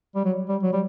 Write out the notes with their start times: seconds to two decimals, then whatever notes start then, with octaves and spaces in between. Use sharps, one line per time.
0.15 G3
0.25 F#3
0.49 G3
0.63 F#3
0.73 G3